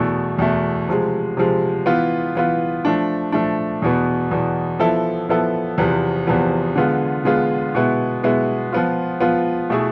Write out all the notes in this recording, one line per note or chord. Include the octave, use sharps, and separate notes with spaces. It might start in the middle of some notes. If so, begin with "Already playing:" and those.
Already playing: E2 B2 A3 E4
E2 B2 A3 E4
C3 F3 G#3
C3 F3 G#3
E3 B3 F4
E3 B3 F4
F3 A3 D4
F3 A3 D4
E2 B2 B3
E2 B2 B3
F3 B3 E4 A4
F3 B3 E4 A4
E2 C3 F3 B3
E2 C3 F3 B3
D3 G#3 B3 F4
D3 G#3 B3 F4
B2 G#3 B3 E4
B2 G#3 B3 E4
F3 B3 F4
F3 B3 F4
B2 A3 E4 G#4